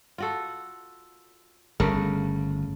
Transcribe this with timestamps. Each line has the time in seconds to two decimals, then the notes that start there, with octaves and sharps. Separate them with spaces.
0.18 F4 F#4 A4
1.80 G1 C#3 A3 A#4